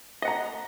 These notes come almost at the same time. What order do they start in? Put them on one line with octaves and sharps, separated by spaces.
D#5 F#5 A#5